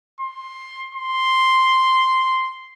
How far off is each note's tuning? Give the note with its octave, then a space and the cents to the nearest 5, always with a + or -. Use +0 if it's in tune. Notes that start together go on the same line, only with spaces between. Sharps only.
C6 +15
C6 +0